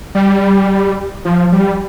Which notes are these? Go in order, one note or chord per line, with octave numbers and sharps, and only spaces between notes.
G3
F3
G3